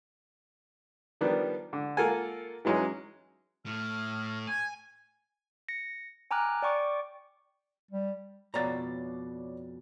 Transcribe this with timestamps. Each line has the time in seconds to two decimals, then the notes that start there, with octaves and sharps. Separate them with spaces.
1.21 D#3 F3 G3 B3 D4
1.73 D3
1.97 A#3 F4 A4 A#4 F#5 G#5
2.65 E3 F#3 G#3 C#4 D#4
3.66 A2 F6
4.47 G#5 G#6
5.68 A#6 C#7
6.31 G5 G#5 A#5 D6 F6 F#6
6.62 D5 G5 C#6 D6
7.91 G3
8.54 F2 B2 C#5 D5 A#5 A6